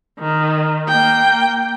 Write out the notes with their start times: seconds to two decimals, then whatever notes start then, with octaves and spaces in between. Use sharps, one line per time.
0.19 D#3
0.88 A#3 G5